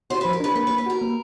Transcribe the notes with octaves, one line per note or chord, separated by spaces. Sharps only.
F#4 C5
F3 B4
A#4
D4 B4
A#3 B4
B4
A#3
B4
F#4 A#4
A#3